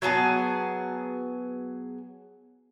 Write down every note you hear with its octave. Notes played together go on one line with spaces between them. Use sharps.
F#3 B3 G#4 A5